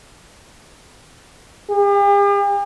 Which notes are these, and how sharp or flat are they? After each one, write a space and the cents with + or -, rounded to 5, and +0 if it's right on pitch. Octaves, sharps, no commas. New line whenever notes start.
G4 +45